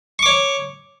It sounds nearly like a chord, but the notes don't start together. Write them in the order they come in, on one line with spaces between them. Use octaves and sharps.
C#6 D6 C#5